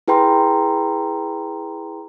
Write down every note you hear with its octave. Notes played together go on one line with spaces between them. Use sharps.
E4 G#4 B4 G5 A#5 C6